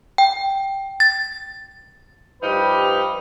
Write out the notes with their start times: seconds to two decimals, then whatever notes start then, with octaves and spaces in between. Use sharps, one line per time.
0.18 G5
1.00 A6
2.42 G2 F3 D#4 G4 B4